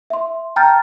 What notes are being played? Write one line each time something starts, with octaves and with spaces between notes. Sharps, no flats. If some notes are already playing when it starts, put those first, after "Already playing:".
E5 C6
G5 A5 A#5 F6 G6 A6